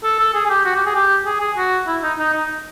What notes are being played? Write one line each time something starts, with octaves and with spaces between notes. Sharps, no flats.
A4
A4
G#4
G#4
G4
F#4
G4
G#4
G4
G#4
G#4
F#4
E4
D#4
D#4
D#4